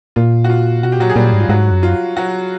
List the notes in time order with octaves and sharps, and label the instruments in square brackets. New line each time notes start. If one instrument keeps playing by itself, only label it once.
[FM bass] A#2 [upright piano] F4
[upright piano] F#4
F4
[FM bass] B2 [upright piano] F#4
[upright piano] G4
[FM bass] A#2 [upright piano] F#3 F#4
[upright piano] G#4
[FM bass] A#2 [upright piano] G3 G4
[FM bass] G#2
[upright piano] F4
[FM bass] G#2 [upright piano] F#3 F#4
[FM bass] F#2
[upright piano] F4
F#3 F#4